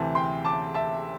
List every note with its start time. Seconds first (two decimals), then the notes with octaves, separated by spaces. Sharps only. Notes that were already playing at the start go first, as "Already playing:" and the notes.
Already playing: D2 C3 E3 C4 A5
0.15 G5 C6
0.45 A5 D6
0.74 E5 A5